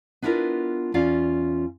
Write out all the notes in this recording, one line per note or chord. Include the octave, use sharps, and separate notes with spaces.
B3 D4 E4 F4 A#4 B4
E2 C#4 F4 D5 F5